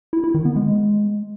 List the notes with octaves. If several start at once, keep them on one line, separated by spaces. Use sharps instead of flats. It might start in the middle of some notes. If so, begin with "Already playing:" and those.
E4
E4
D#3
B3
G#3